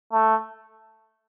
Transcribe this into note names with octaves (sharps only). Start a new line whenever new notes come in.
A3